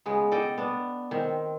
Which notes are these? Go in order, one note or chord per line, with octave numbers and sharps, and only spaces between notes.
C#3 G#3 B3
A4 D5 D#5 G5
B3 D4
D#3 C4